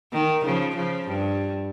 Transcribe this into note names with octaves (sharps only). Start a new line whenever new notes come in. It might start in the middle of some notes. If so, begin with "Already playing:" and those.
D#3
C#3 F3
C#3 F3
G2